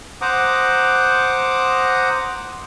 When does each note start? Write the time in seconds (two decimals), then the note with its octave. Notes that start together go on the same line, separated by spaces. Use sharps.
0.21 C5 F#5 A#5 D6 D#6